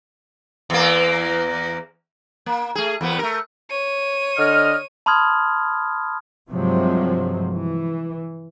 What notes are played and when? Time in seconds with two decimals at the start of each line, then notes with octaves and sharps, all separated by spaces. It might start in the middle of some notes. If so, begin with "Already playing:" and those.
0.70 E2 A#3
2.46 A#3
2.75 A3 G#4
3.01 E2 A#3 B3
3.19 A3 A#4
3.70 C#5 D#7
4.38 D3 D#5 F6
5.06 A5 B5 C6 D#6 F6 G#6
6.51 G2 C3 F3 F#3 G#3
7.52 E3